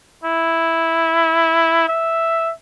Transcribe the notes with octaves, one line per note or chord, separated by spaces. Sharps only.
E4
E5